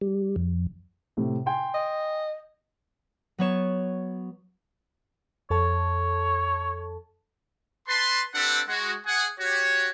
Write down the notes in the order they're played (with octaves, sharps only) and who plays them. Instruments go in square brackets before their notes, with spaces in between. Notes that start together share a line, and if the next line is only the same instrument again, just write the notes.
[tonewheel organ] G3
F2
[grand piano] A2 C3 C4
G5 G#5 C6
[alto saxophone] D#5
[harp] F#3 B3 C#5 E7
[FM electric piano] F2 A4 A5 [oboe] C#5
[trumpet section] B4 A5 C6
C4 D4 G4 A4 B4 F#5
G#3 F#4
G#4 F#5
F#4 G4 C#5